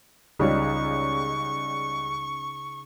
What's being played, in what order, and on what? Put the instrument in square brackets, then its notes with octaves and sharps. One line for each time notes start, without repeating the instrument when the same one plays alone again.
[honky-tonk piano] C#2 G3 C#5 [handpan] C#3 D#4 [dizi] C#6